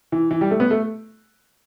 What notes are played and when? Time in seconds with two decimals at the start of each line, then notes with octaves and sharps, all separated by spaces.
0.12 E3
0.31 E3
0.41 G3
0.51 A3
0.60 B3
0.71 A3